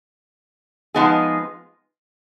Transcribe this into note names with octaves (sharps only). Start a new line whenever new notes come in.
F3 G#3 B3 D#4 G#4